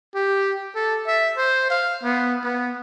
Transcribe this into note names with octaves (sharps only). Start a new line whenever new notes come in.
G4
A4
E5
C5
F5
B3
B3